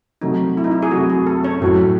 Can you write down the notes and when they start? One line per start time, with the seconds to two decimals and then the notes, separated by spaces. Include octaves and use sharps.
0.21 C3 F#3 A3 D#4
0.57 E4
0.64 D#4
0.71 E4
0.83 G#4
0.91 C3 F#3 A3 F#4
1.10 G#4
1.27 A4
1.43 C#4 C#5
1.61 A2 F#3 C#4 F#4 A4